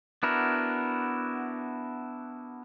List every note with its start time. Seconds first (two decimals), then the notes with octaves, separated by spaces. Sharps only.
0.23 B3 D4 E4 F#4 A#4